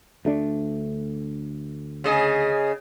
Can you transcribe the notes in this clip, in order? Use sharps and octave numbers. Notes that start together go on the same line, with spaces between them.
D2 A3 D4
C#3 G#4 D#5